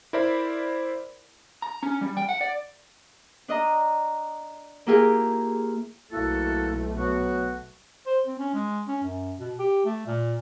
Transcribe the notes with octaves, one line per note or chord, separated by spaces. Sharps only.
E4 A#4 C5 D5 E5 B5
A#5
C#4
G3
G5
F#5
D5
D4 D#5 A#5
A#3 E4 F4 G4 G#4 A#4
B1 A3 A#3 E4 F#4 A4
F#3 B3 F#4
C5
C4
C#4
G#3
C#4
F#2
B2
G4
A3
A#2